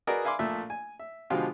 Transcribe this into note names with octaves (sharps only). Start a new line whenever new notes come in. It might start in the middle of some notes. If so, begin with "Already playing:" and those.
F#4 G#4 A#4 B4 D5 D#5
E5 F5 G#5 B5 C6 D6
A#1 A#2 A3 E5
G#5
E5
B2 D3 F3 G#3 F4 G4